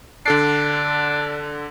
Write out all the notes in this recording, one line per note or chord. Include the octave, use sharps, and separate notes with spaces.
D3 D4 A4 C7